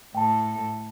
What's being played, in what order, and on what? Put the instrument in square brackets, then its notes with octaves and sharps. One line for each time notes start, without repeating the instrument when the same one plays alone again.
[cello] A2 A4 [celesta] G5 A5